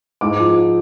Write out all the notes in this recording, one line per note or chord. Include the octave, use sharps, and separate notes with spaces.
G#2 D6
F3